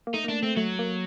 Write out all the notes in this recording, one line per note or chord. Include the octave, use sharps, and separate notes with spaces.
A#3
A3 D#4
A#3
A3 D4
A3 C4
F#3 A3
A#3